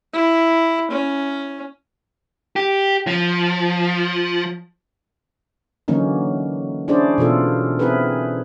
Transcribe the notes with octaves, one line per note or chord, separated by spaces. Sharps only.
E4
C#4
G4
F3
D3 E3 F#3 A#3 C#4 D#4
C#4 D4 E4 G#4 C5 D5
B2 E3 F4 A4
C4 E4 G#4 A#4 B4